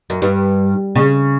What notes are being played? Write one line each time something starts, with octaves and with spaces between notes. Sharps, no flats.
F#2
G2
C#3